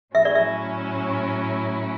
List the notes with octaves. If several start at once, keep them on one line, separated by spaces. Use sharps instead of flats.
A2 F#3 C#4 E4 E5
D5
E5